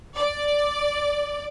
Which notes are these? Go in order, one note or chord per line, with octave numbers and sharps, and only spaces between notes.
D5